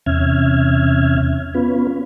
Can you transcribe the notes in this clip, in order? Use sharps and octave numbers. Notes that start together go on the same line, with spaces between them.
E2 C3 C#4 E5 F6 G#6
B3 C#4 F4 B4